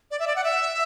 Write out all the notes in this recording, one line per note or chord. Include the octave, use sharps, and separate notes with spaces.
D5
E5
D5
F#5
E5